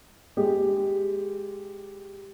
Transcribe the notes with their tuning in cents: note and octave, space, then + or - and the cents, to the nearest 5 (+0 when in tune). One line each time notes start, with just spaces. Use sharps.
G#3 +0 G4 +0